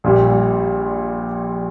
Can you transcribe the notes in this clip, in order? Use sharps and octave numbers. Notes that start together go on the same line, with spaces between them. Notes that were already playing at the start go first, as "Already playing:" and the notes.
A#1 A#2 G3